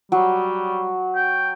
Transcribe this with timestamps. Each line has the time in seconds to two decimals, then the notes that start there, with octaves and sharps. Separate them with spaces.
0.12 F#3 G3
1.15 G5